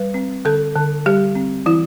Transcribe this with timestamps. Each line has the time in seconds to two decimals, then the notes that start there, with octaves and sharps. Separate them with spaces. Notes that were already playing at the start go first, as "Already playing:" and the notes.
Already playing: G3 B4
0.14 C4
0.45 D3 A4
0.76 D3
1.06 G3 G4
1.35 C4
1.66 E3 E4